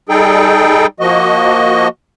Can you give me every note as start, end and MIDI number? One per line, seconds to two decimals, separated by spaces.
0.09 0.86 55
0.09 0.86 63
0.09 0.86 68
0.09 0.86 69
0.09 0.86 79
1.00 1.88 53
1.00 1.88 58
1.00 1.88 66
1.00 1.88 75